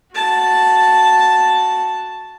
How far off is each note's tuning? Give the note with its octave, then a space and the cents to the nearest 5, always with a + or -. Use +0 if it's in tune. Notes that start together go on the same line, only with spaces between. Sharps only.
F#4 +0 A5 +0